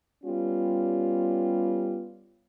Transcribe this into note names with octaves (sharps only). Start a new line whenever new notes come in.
G3 B3 C#4 F4 G4